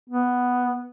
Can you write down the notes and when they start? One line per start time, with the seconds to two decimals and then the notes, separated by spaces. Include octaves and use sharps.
0.10 B3